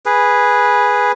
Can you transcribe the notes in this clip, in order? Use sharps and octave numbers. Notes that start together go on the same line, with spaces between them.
G#4 B4